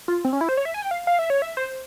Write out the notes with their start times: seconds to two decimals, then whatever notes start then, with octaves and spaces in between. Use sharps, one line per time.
0.08 F4
0.25 C4
0.33 C#4
0.41 E4
0.49 C5
0.57 C#5
0.65 E5
0.74 G#5
0.82 G5
0.91 F5
1.07 F5
1.19 E5
1.30 C#5
1.42 E5
1.57 C5